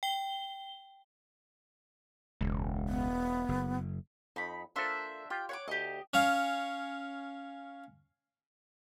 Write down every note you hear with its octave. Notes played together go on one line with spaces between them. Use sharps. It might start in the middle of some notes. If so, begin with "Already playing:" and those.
G5 G7
E1 C#2
B3
F#1
F2 D#4 B5
A#3 D4 F4 A4 C5 E5
F4 G4 G5
C#5 F#5 D6
D2 G4 D#5
C#4 C#5 F5